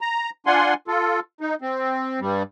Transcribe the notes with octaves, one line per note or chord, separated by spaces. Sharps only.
A#5
D4 F4 F#5 G#5 C6
F4 A4
D#4
C4
G2 G3